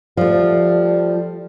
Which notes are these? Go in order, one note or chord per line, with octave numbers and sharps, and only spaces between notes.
F3 G3 A3